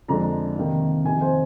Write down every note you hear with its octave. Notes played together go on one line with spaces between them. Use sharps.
F2 D3 G#3 D4 A#5
C3 D#3 A#3 D#4
F2 C3 D#3 G#5
C5